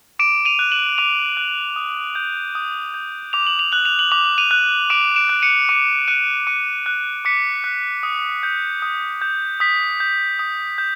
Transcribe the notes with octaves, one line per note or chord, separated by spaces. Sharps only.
D6 D7 E7
D#7 F7
F#6
E7 F#7
D6 D#7 F7
F#6
D#6
G6
D#6
G6
D6 F7
F#7
F7
F#6 F#7
F7
F#7
D6 F7
F#7
D#7 F7
F#6
D6 D7 E7
D7 E7
F#6
C#7 D#7
D6 C#7 D#7
F#6 C#7 D#7
D6 C#7 D#7
F#6
D6 B6 C#7
F#6
D#6
G6
D#6
G6
D#6 B6
G6
D#6
G6